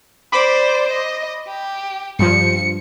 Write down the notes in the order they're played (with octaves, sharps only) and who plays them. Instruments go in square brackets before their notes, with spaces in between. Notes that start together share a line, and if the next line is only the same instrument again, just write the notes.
[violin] C5 D5 [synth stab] B5 D6
[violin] D#5
G4
[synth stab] G2 F3 [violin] C#7